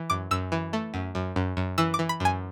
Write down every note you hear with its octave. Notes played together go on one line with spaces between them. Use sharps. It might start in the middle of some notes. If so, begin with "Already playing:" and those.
Already playing: E3
F#2 D6
F#2 E6
E3
A3
F#2
F#2
F#2
F#2
E3 E6
D6
E3
B5
F#2 G#5